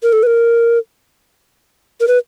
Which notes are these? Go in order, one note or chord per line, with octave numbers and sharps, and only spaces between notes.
A#4
A4
B4
A#4
A#4
B4